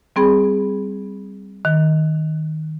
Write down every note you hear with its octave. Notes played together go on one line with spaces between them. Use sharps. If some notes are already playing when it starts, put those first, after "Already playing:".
G3 C4 G#4 B5
D#3